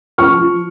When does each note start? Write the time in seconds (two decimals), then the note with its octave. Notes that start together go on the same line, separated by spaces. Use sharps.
0.18 F3 C#6 F6
0.38 F3